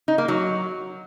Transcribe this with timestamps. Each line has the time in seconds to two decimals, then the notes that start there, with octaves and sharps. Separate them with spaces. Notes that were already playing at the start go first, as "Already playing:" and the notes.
0.08 D#4
0.18 A#3
0.28 F#3